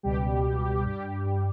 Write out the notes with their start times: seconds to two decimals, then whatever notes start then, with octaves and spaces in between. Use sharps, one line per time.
0.03 C#2 B2 G3 G4
0.44 C#2 B2 G3
0.85 G2 G3 G4
1.25 G2 G3